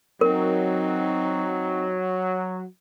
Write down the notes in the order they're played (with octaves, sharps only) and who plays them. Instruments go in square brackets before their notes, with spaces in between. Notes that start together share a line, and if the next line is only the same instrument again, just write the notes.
[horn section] F#3 [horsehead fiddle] C4 D#4 [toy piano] A#4